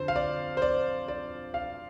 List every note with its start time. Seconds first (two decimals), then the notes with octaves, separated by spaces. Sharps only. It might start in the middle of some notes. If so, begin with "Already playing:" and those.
Already playing: F2 D3 C5
0.08 F5
0.16 D5
0.57 C5
0.62 D5
1.08 D5
1.54 F5